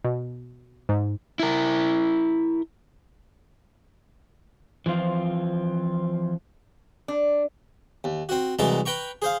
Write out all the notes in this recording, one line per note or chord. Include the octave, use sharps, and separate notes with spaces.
B2
G#2
E4 A#4
E3 F3 C4 F4
D4
D#2
C4 F#4
C2 E3 F#3 G#3 A5 A#5
B4 G5 A#5 C#6
G#4 C5 F5